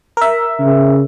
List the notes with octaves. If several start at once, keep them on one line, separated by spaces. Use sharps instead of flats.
A#4 E5
C#3